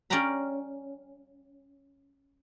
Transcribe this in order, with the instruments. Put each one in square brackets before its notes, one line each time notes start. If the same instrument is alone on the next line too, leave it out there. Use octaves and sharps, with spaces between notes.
[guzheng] C#4 D5 F5 G5 A#5 B5